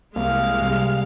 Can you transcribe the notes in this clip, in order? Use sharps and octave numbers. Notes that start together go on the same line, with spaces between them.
C2 G#3 A#3 F5
C3 G3